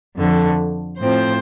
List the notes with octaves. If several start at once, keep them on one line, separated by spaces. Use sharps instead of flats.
F2 D3 A3
A2 F3 C4 C5